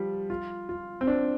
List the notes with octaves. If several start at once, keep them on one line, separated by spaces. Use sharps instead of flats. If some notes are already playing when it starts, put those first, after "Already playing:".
Already playing: F3 G3
F4
F4
C4
D4